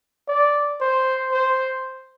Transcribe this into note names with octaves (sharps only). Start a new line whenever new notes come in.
D5
C5
C5